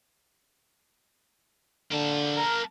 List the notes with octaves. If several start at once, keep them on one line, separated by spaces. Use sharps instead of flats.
D3 A#3 A5
A#4